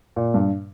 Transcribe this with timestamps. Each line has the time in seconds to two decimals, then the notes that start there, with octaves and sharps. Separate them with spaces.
0.16 A#2
0.34 G2